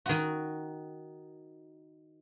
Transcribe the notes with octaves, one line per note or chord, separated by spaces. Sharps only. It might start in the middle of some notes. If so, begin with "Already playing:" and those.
D#3 F#4